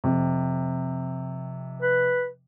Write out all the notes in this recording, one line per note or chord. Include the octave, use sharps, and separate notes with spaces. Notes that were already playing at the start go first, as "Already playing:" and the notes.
F2 C3
B4